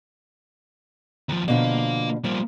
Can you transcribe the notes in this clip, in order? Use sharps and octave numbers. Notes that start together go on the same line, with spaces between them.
D#2 F3
B2 D3 F3 A#3 F5
F3 G3 A#3